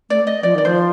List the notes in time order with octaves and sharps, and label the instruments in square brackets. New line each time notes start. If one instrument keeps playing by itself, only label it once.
[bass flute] A3 [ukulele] D5
[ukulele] D#5
[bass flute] F3 [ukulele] D5
[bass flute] D#3 [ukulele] D5
[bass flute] F3 [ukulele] C5